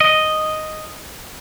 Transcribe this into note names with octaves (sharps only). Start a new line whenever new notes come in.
D#5